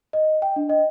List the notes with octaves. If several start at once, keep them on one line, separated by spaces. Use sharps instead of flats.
D#5
G5
D4
D#5